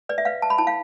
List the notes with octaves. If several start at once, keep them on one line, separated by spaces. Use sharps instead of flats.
B4 D5
E5
B4 F5
B4 A5
B5
E4 A5
F5